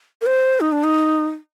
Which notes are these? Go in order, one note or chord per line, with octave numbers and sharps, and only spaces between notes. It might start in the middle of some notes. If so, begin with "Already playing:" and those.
A#4
C5
D#4
D4
D#4